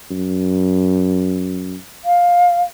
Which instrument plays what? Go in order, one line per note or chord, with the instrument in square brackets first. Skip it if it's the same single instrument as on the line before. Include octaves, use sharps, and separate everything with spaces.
[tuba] F#2
[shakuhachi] F5